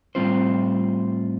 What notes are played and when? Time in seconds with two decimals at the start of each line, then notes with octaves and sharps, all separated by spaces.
0.15 A2 G3 C4 F4 C5